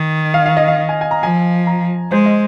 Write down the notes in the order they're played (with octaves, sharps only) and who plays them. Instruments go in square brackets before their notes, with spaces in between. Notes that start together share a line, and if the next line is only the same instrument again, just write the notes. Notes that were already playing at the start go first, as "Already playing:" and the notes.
Already playing: [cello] D#3
[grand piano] F5
F5
D#5
F5
G#5
G#5
A#5
[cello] F3 [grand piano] G#5
[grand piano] A#5
[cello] G#3 [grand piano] C5
[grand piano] D#5